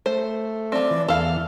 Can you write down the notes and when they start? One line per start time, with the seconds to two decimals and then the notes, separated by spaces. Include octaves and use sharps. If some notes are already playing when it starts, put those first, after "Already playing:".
0.06 A3 C5
0.72 F3 C4 D5
0.91 E3
1.08 E2 E4 A4 F5 F6